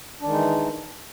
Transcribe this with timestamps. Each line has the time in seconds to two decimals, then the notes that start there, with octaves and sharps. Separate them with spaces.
0.21 D4
0.25 D#3
0.28 G#3
0.31 D#4
0.34 E3